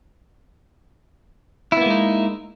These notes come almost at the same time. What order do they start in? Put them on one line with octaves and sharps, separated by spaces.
E4 B3 A#3 G#3 D#4